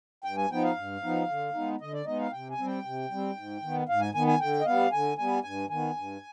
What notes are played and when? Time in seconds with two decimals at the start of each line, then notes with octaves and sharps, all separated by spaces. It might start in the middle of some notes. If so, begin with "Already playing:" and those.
0.24 G2 G5
0.37 G#5
0.51 F3 B3 D#4 G5
0.64 F5
0.76 G2
1.03 F3 B3 D#4
1.29 D3
1.54 G#3 B3 D#4
1.81 D3 D#5
1.93 D5
2.06 G#3 B3 D#4 D#5
2.20 F5
2.32 C3 G5
2.50 G#5
2.58 G3 C4
2.67 G5
2.85 C3
3.11 G3 C4
3.37 G#2
3.62 D#3 B3
3.89 G#2 F5
4.01 G#5
4.14 D#3 B3 G#5
4.27 G#5
4.40 D3 G5
4.61 D#5
4.66 G3 B3 F5
4.92 D3 G#5
5.18 G3 B3 G#5
5.43 G2 G#5
5.69 D#3 B3 G#5
5.97 G2